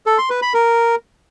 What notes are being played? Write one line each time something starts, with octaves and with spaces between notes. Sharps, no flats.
A4
C6
B4
B5
A#4